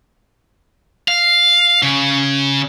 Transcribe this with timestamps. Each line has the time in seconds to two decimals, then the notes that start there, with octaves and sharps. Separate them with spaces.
1.08 F5
1.83 C#3